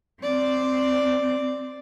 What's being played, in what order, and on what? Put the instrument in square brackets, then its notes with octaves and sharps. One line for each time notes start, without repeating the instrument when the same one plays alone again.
[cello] C4 [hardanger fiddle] D5